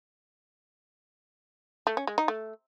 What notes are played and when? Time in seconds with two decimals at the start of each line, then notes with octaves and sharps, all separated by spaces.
1.87 A3
1.97 C#4
2.07 G#3
2.18 D#4
2.28 A3